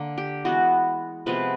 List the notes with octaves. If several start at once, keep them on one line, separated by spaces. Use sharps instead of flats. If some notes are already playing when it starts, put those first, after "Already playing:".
Already playing: D3 A#3
G4
E3 G#3 B3 F#4
C3 F3 G#3 B3 B4